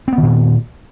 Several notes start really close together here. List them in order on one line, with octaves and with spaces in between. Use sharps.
C4 B3 D#3 A#2